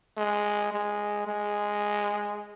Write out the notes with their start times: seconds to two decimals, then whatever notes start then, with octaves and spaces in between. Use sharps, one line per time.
0.18 G#3
0.73 G#3
1.27 G#3